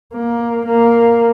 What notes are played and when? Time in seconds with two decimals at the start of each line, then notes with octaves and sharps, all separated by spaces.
0.13 A#3
0.66 A#3